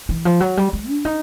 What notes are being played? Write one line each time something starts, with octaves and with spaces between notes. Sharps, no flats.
E3
F3
F#3
G3
G#3
D4
D#4